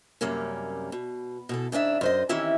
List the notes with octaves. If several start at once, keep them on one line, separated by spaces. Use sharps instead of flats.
F#2 C3 G3 A#3 C#4
B2
B2 E3 A4
G#2 C#3 D4 E5
F#2 C5 D#5
D#3 E3 C4 C#4 E4 G4